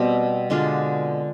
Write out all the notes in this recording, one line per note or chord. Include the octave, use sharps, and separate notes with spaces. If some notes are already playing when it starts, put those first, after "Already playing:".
Already playing: B2 G3 C4
D3 G#3 D4 F4